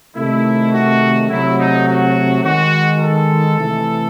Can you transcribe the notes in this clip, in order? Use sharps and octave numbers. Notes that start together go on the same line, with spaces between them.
C3 D#3 A3 E4
F#4
C3 F#3 A3 E4
D#4
F#4
D#3 G#3 F#4
A4
C3 E3 A3